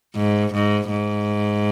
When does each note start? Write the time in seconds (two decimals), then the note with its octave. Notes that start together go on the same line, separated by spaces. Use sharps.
0.16 G#2
0.53 G#2
0.91 G#2